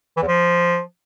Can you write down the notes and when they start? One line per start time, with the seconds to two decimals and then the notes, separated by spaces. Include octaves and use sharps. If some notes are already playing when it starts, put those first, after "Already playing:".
0.17 E3
0.22 E2
0.28 F3